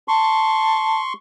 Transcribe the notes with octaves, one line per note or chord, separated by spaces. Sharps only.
A5 C6 C#6